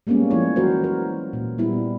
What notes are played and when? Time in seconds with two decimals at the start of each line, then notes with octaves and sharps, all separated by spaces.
0.07 G3 G#3 A#3 B3 C#4
0.31 F3 E4 C#5
0.56 E3 F#3 F#4 A#4 C5
0.84 A#4
1.33 A#2
1.58 G3 B3 E4